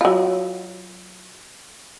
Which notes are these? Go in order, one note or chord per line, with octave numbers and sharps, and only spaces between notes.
F#3 F4